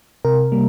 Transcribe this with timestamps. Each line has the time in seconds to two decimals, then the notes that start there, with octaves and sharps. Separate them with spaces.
0.25 C3 A#4
0.52 G3 A#3